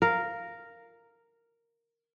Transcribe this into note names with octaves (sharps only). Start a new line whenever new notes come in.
A#4 F5